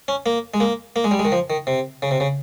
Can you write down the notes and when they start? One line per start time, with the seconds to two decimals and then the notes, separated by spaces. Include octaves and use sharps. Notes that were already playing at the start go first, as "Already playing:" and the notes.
0.08 C#4
0.26 A#3
0.54 G#3
0.60 A#3
0.96 A#3
1.04 G#3
1.11 G3
1.19 G#3
1.25 D#3
1.32 F3
1.50 D#3
1.67 C3
2.02 C#3
2.11 C3
2.20 C#3